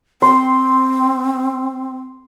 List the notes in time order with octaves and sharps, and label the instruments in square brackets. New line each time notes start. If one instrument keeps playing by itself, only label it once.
[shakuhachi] C4 [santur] C6